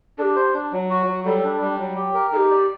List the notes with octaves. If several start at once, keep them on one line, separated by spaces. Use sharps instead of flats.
D4 G4 A4
C5
D4
F#3
F#4
F#3
G3 A4
D4
G3
F#3
G4
A#4
D#4 G4 A4
D5